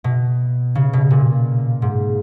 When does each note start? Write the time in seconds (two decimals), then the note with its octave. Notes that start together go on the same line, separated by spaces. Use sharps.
0.04 B2
0.75 C#3
0.93 B2
1.10 A#2
1.82 G#2